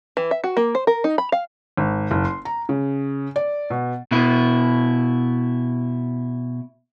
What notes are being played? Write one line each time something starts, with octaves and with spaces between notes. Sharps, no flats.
E3
E5
F#4
A#3
C5
A#4
D#4
B5
F5
G#1
F#1
C6
A#5
C#3
D5
B2
B2 E4